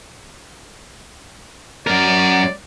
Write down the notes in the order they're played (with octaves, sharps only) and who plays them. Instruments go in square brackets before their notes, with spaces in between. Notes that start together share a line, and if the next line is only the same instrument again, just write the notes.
[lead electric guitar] F#2 A#4 [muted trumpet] D5